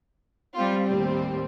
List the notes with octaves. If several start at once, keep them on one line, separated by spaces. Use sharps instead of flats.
G3 C4 F4
D#2 A2 G3 C4